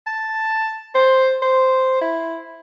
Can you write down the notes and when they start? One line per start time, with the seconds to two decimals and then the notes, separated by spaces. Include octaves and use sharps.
0.07 A5
0.95 C5
1.42 C5
2.01 E4